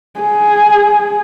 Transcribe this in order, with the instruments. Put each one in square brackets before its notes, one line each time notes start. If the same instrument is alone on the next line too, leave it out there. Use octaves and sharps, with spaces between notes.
[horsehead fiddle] G#4